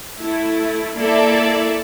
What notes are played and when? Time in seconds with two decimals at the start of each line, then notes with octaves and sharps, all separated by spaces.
0.19 A3 E4
0.97 A#3 E4 A4 D5 E5